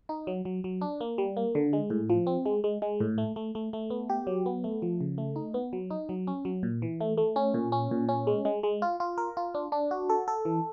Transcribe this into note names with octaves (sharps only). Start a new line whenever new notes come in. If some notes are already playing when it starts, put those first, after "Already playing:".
D#4
F#3
F#3
F#3
D4
A#3
G3
A#3
D3
G#3
A2
F3
C4
G#3
G#3
G#3
A2
A3
A3
A3
A3
B3
G4
F#3
B3
A3
F3
C#3
A3
D#4
B3
F#3
D#4
F#3
C#4
F#3
A#2
E3
A3
A3
C#4
A#2
C#4
A#2
C#4
G#3
G#3
G#3
F4
F4
A#4
F4
D4
D4
F#4
A4
A4
E3